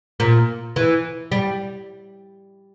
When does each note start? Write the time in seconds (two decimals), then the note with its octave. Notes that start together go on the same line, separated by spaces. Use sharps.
0.20 A#2
0.76 E3
1.32 G3